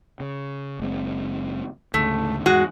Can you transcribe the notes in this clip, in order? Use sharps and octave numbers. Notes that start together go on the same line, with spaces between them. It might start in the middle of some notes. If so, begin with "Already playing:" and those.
C#3
F#1 G#3 C4
D2 G#2 C#3 A3
E2 G#2 G#3 F#4